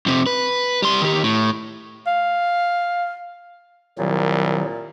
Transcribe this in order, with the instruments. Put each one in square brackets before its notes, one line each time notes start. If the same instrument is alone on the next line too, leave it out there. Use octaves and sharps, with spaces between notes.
[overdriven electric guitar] F2 C3
B4
G3 C6
D#3 G4
A2
[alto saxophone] F5
[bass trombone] C2 [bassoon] A#2 [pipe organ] D#3 F#3